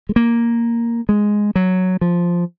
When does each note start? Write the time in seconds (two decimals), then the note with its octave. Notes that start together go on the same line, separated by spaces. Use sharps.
0.09 G#3
0.16 A#3
1.09 G#3
1.56 F#3
2.01 F3